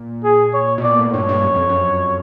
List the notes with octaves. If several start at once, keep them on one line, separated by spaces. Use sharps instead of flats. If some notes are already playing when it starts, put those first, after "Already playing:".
Already playing: A#2
G#4
C#5
B2
A#2 D5
A2
G2 C#5
G2
F#2
F2
F#2